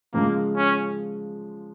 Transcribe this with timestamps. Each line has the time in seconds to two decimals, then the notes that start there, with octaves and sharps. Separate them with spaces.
0.13 C#3 F3 G#3 A#3
0.57 C#4